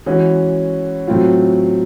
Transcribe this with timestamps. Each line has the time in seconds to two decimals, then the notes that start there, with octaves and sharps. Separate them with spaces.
0.06 E3 G#3 C#4 F#4
1.08 A2 F#3 A3 C4 F4